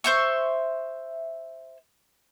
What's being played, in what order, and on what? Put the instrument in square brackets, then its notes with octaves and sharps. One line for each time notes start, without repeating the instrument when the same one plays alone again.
[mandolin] C5 E5 C#6